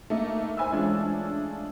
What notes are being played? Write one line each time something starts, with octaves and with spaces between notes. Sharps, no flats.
A3 A#3 D#4
C5 E5 G#5 B5 E6
E3 G#3 A3 C#4 D4 F4